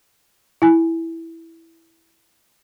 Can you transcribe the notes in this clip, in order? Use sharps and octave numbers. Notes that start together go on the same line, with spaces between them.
E4 G#5